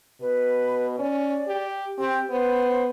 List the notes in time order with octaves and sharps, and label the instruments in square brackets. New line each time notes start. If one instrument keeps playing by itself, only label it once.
[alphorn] B2 [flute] B4
[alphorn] C#4 [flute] D5
[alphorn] G4
[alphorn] C4 [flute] G4
[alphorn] B3 [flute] C5